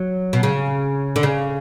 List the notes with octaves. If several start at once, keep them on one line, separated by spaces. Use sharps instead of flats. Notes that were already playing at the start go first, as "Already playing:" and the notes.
Already playing: F#3
B2
C#3
D3
C#3